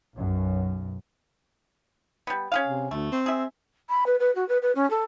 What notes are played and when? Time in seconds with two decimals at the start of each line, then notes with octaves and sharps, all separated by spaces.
0.16 B1 F#2
2.27 G3 B3
2.52 C#4 G#4 F5
2.67 C3
2.91 D2 A3
3.12 C4
3.26 G#4 E5
3.89 B5
4.06 B4
4.20 B4
4.35 F#4
4.48 B4
4.62 B4
4.75 C#4
4.90 A4